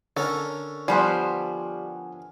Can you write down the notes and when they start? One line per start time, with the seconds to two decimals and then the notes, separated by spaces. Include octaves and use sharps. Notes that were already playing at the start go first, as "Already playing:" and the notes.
0.17 D3 C#4 A4 A#4
0.88 F3 G3 B3 C5 F#5 G#5